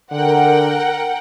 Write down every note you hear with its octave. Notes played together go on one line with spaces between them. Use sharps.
D3 A#4 F#5 G5